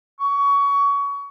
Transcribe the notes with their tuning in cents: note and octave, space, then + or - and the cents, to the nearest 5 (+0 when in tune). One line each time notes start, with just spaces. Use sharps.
C#6 +25